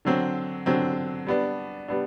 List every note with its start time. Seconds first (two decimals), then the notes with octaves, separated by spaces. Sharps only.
0.05 D3 F#3 C4
0.66 D3 F#3 C4
1.27 G3 B3 D4
1.88 G3 B3 D4